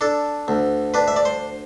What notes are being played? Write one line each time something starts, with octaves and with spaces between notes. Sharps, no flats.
D4 A4
D2
D4 B4
E5
D5
C5